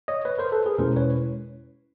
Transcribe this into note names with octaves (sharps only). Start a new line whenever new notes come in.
C#5 D#5
B4 C#5
A#4 C5
A4 B4
G#4 A#4
E2 B2 G#3 C#4 E4 A#4 C5
B4 C#5